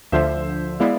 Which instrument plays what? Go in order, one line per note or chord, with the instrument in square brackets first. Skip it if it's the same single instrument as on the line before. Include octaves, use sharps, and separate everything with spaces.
[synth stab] D2 D3 F3 [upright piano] C5 E5
[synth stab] G#3 B3 E4 [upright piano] D5 F5